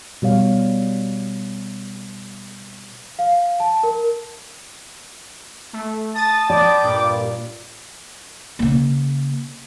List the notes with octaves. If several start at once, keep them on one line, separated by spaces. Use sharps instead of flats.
B2 G3 C#5 F5
F5
A5
A#4
A3
A5 D#6 A6
D5 G5 B5 D6
G2 A#2
C#3 A#3